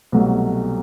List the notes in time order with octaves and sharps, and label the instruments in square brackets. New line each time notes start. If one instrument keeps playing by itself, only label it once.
[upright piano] C2 B2 F#3 A3